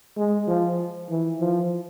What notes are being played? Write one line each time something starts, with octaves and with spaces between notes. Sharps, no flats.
G#3
F3
E3
F3